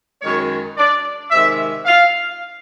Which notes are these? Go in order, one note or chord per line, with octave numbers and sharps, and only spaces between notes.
F#2 D#3 G#3 C#5
D5
C3 D#3 G#3 E5
F5